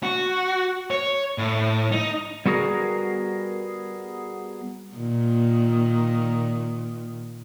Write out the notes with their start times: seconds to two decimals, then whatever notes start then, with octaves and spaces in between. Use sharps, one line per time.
0.03 F#4
0.91 C#5
1.38 A2
1.92 D#4
2.46 G3 B3 F#4 G#4 A#4
4.96 A#2 D#3